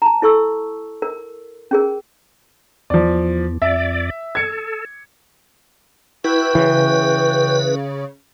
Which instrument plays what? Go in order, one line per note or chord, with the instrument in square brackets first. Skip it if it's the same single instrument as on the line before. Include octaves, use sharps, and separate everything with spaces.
[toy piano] A5 A#5
E4 A4 C#6 E6
A#4
C#4 G#4 A#4
[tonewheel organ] E2 [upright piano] F3 D5
[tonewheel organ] F2 D5 [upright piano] E5
[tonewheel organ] A4 [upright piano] G#6 C#7
[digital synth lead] E4 [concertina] F#4 G5 [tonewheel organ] B4
[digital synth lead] C#3 [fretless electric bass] E3